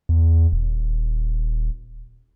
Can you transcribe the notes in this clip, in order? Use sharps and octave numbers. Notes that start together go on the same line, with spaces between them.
E2
D#1